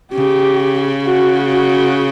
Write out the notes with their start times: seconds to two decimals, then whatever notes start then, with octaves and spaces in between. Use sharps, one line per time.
0.13 C#3 G4
1.06 F#4
1.53 F#4